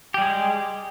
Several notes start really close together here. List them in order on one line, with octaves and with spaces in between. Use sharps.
G4 G3 G#4 G#3